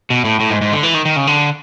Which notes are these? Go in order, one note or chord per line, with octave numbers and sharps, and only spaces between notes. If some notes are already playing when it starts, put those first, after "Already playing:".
B2
A2
A2
G#2
G#2
D3
E3
D#3
D#3
C#3
D3